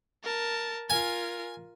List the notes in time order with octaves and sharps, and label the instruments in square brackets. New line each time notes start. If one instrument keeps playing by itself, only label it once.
[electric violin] A#4 A5
[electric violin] F4 A#4 [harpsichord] G#5